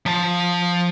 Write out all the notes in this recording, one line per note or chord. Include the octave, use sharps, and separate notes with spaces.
F3 A5